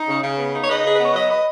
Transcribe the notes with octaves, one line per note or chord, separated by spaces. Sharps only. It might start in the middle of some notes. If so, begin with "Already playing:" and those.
Already playing: D#4
C#3
C#3
B3
D#4
C#5
C#3 B4 D#5
C#3 G#4
B3 B4
C#5
F#3 B4 D#5
B4 D#5